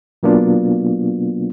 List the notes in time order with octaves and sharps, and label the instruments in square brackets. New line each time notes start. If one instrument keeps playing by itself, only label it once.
[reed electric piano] B2 F#3 A#3 B3 D4 F4